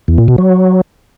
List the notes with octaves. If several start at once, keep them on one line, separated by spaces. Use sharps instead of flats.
E2
A#2
B2
F#3